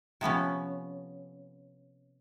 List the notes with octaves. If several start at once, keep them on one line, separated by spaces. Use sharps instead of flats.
C3 F3 B3 C#4